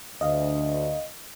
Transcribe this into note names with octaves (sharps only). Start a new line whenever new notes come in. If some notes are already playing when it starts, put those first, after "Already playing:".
D2 D#5 F5